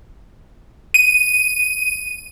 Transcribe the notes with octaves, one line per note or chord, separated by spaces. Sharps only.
D#7